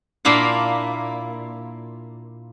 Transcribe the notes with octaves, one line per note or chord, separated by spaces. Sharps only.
A#2 A#3 D4 E4 F5